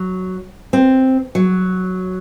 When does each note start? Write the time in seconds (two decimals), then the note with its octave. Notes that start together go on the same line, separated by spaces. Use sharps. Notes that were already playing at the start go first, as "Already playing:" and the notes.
Already playing: F#3
0.73 C4
1.35 F#3